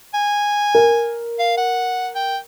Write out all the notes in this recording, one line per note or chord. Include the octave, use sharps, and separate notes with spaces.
G#5
A#4
F5
F#5
G5